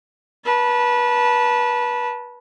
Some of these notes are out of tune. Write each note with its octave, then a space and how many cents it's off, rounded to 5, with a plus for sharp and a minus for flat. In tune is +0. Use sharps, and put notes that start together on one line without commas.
B4 -25 A5 +0